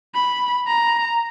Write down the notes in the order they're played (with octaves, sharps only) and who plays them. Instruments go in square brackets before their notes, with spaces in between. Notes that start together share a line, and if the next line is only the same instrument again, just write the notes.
[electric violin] B5
A#5